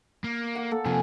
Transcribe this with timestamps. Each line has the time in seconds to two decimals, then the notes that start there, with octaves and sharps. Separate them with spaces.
0.24 A#3
0.55 F#5 D6
0.71 A#3 A4
0.85 C3 F3 G#5